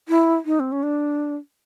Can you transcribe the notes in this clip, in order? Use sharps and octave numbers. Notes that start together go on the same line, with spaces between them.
E4
D#4
C4
C#4
D4